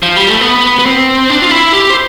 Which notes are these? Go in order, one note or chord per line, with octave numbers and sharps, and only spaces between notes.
F3
G3
A3
B3
B3
C4
D4
F4
E4
G4
C5